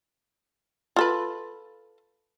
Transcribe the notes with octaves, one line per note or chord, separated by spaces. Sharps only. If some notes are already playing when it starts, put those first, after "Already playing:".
F4 A4 B4